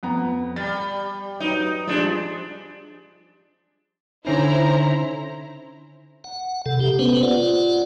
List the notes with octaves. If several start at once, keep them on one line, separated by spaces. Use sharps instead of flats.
F2 B3 A#5
G3 A6
F#3 D#4 B4 D7
F3 G3 G#3 D4
D3 C#4 D#4 E4 C5 A#5
F#5
C3 A4
G4
B3 C#4 B4 C5
F4 D5 F#5